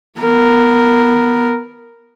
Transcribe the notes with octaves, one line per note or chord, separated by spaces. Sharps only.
B3 A#4